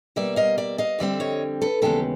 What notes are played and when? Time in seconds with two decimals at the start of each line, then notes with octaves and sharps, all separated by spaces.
0.16 B2 G3 A#3 D5 E5
0.36 D#5 F5
0.58 D5 E5
0.78 D#5 F5
0.99 F2 D3 G3 C4 D5 E5
1.20 C#5 D#5
1.62 A4 B4
1.82 D#2 C#3 E3 G#3 B3 G4 A4